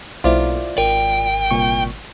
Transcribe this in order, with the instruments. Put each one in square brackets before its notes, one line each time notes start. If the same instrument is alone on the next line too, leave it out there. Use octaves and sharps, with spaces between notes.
[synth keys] B1 A#3 [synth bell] E4 C5 E5 [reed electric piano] F4 D5
[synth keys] G#1 [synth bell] A#4 [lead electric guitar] G5
[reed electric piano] C2 A#2 C#6